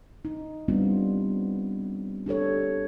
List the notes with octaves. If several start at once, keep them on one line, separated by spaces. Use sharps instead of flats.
D#4
G3 B3 C4 D4 F4
D4 G4 A4 C#5